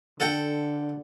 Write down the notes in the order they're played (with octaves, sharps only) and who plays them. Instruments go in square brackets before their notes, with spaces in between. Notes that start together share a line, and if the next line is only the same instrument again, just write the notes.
[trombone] D3 [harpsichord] A4 F#5 G5